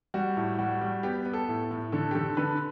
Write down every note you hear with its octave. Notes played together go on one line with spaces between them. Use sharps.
G3 F#4
A2
G3 F#4
G3
B3 G4
B3
A4
A2
A2
D3 A4
G4
D3 A4
D3 B4